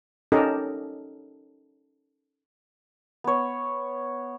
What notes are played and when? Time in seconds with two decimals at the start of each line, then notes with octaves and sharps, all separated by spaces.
0.32 C#4 D#4 G4 A4 A#4 D#5
3.24 B3 C#5